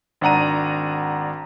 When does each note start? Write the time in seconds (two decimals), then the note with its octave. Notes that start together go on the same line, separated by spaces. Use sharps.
0.21 G#1 D4 F#5 A#5 D#7